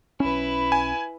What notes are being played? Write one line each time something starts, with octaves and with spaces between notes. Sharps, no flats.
B1 C#4 E4 B4
G#5